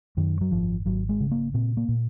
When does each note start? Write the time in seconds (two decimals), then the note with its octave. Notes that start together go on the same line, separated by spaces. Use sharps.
0.17 F#2 D#3
0.41 F#3
0.51 G#1 F3
0.85 G#1 F#3
1.09 G#3
1.20 C#3
1.31 A#3
1.54 A#2 C4
1.77 A#3
1.88 A#2